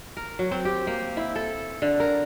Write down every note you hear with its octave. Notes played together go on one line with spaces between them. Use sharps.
A#4
F#3
C4
G4
A#3
E4
A4
D3
A#4